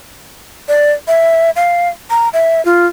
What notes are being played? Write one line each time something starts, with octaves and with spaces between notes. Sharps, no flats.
D5
E5
F5
A#5
E5
F4